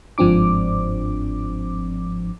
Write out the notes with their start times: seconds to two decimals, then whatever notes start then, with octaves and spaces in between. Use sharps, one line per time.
0.18 G1 G#2 F3 C4 D4 D6